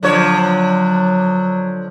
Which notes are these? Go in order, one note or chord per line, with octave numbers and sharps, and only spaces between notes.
D3 F3 F#3 C#5